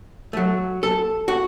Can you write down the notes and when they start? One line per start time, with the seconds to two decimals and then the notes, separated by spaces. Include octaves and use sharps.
0.33 A3
0.37 F#3
0.83 A4
1.28 F#4